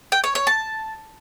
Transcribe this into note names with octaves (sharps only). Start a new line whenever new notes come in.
G5
C#5
C#5
A5